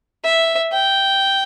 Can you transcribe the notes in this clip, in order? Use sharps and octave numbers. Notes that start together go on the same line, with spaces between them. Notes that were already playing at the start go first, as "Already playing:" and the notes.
E5
G5